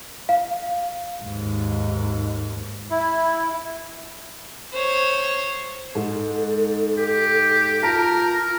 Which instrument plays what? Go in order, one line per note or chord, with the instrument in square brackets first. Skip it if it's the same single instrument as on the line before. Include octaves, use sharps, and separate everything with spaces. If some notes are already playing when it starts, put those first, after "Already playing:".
[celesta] F5
[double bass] D#2 G#2
[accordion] E4
[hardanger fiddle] C5 C#5
[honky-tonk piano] G#2 [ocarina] A4
[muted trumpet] G4
[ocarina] F4 [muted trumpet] A#4 [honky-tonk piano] A5 A#5